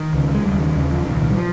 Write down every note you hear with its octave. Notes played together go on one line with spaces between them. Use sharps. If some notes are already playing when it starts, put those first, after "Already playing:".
Already playing: D#3
C#2 C#3
G#3
D#2 C#3 G3
D#3
D#2 C#3
F3
C2 A#2 D#3
G3
F3